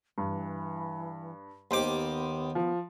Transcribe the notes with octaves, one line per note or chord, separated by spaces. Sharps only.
G2 E3
D#2 B3 G4 C5 C6 D6
F3